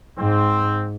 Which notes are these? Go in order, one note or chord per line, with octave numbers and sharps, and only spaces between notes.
G#2 C4